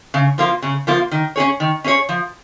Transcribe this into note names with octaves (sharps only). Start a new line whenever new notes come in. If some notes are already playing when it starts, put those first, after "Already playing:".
C#3
F3 A#3 F4
C#3
F3 A#3 F4
D#3
C#4 G#4 C#5
D#3
C#4 G#4 C#5
F3